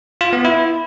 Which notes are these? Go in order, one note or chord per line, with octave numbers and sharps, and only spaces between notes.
F4
B3
E4